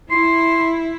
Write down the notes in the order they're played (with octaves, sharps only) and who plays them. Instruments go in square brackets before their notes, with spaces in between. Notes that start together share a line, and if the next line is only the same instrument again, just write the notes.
[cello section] E4 [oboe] C6